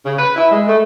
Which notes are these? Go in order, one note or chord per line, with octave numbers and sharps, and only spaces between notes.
C#3
B4
E4
G#3
A3